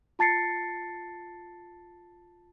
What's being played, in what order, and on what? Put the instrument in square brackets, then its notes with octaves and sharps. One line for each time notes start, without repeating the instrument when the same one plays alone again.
[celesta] F4 A5 A6 C7 C#7